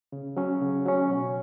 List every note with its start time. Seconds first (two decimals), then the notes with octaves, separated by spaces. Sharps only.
0.12 C#3
0.37 F#3 C#4
0.62 C#3
0.86 F#3 C#4
1.10 B2